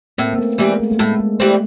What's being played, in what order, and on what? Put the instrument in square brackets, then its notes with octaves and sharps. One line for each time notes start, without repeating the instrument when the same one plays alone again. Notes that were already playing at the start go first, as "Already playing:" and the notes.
[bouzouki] A2 [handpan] A#3 C4
[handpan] A#3
A3 B3
[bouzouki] E3 G3 C4 [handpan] G#3 A#3
[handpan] A3
A3
[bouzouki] A2 [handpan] G#3
[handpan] G#3
[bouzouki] E3 G3 C4 [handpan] A3